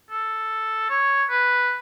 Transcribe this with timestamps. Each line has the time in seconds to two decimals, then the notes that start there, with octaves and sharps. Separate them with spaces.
0.11 A4
0.90 C#5
1.30 B4